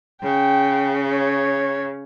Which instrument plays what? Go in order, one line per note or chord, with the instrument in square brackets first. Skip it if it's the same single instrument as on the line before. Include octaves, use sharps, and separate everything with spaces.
[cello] C#3 [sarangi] G5
[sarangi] C#5